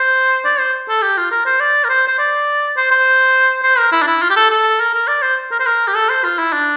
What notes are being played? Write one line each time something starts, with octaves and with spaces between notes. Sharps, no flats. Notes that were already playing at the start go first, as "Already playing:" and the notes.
Already playing: C5
D5
C5
A4
G4
F4
A#4
C5
D5
A#4
C5
C5
D5
C5
C5
C5
A#4
E4
D4
E4
F4
G4
A4
A4
A#4
A#4
D5
C5
A#4
C5
A#4
G4
A4
C5
F4
E4
D4